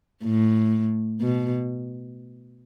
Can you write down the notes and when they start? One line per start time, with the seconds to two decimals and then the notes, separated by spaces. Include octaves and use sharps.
0.24 A2
1.22 B2